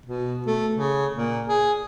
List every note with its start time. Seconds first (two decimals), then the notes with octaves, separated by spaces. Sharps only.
0.06 B2
0.47 A3
0.75 C#3
1.16 A#2
1.48 G#4